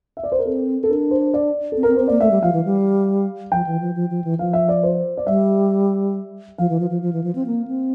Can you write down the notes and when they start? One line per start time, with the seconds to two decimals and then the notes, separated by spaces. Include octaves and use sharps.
0.17 E5
0.23 D5
0.32 C5
0.39 A#4
0.45 C4 A4
0.83 A4
0.89 D4 A#4
1.11 C5
1.34 D5
1.72 C4 A4
1.83 C4 A#4
1.96 C4 C5
2.08 A#3 D5
2.20 A3 E5
2.31 G3
2.43 F3 F5
2.53 E3
2.65 G3
3.51 F3 G5
3.67 E3
3.81 F3
3.95 F3
4.11 F3
4.24 E3
4.39 F3 F5
4.53 E5
4.69 D5
4.83 C5
5.17 D5
5.26 G3 E5
6.58 F3 F5
6.70 E3
6.80 F3
6.90 F3
7.02 F3
7.13 E3
7.24 F3
7.35 C4
7.46 A#3
7.68 C4